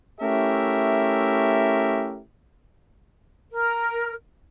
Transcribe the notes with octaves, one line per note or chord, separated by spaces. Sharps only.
A3 C#4 E4 G4 A#4 E5
A#4